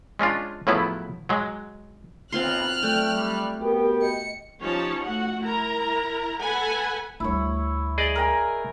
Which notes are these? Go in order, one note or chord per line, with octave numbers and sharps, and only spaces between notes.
G#3 C#4 D4 F4
A2 C#3 F3 F#3 B3 E4
F#3 G#3
B1 C4 F4 C6 F6 F#6
F#3 A3 D5 G5
G3
B3 F#4 G4 A#4 G5
D#5 C#7
F3 C#4 D#4 G4 C#5 A5
A3 F#4 F#5
E4 A#4 A#5
A4 B4 F#5 G#5 B5
D2 G3 E4 C#5
G#4 D5 D#5
A#4 G5 G#5